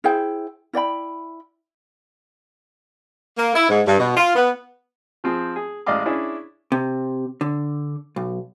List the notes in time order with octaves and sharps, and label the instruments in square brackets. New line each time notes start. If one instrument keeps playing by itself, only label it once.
[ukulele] E4 G#4 C5 G5
E4 D5 G5 B5
[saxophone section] A#3
E4
G#2
G2
B2
F4
B3
[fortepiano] F3 C4 G#4
G#4
A1 G#3 D5 D#5 F5 D6
C#4 D4 E4 G#4 D5
[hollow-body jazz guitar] C3
D3
B1